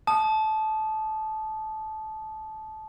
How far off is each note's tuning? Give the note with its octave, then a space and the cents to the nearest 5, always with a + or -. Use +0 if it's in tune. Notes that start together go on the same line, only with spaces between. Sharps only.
A5 -20 D#6 -15